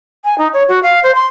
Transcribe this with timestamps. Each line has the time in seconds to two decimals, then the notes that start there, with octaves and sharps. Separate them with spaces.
0.25 G#5
0.38 D#4
0.53 C#5
0.68 F#4
0.83 F5
1.03 C5
1.15 C6